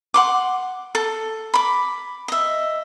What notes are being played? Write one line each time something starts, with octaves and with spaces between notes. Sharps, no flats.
F#5 C6 D6
A4
B5 D6
D#5 E5